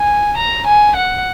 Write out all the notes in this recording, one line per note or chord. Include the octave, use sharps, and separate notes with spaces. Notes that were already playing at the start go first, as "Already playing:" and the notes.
Already playing: G#5
A#5
G#5
F#5